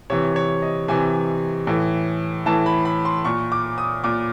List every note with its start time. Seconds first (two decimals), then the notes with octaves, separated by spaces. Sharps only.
0.10 C3 E3 C#5
0.36 C#5
0.62 D#5
0.88 C3 E3 G#5
1.67 A2 E3
2.46 A2 E3 A5
2.66 B5
2.85 B5
3.05 C6
3.25 A#2 C#6
3.52 D6
3.78 D#6
4.04 A#2 D6